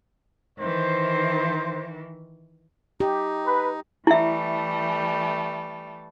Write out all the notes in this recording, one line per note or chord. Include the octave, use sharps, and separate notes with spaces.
D#3 E3 C5
D#4 G4
B4
E3 G3 A3 E4 E5